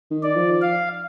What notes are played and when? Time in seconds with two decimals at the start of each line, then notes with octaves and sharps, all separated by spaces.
0.11 D#3
0.23 D5
0.36 F3
0.62 F5